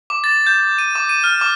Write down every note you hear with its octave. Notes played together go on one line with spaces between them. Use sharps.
D6
A6
G6
D#7
D6
D#7
F6
D6